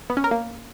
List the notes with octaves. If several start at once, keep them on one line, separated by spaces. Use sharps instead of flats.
B3
C#4
A#4
A#3